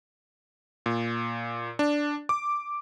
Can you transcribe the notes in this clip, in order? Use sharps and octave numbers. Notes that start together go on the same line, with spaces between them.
A#2
D4
D6